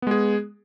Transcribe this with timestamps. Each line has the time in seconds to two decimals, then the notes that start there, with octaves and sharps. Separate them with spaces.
0.02 B3
0.07 G#3
0.11 G#4